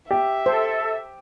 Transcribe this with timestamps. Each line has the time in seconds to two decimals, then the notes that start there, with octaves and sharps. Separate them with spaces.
0.11 G4 E5
0.46 A4 C5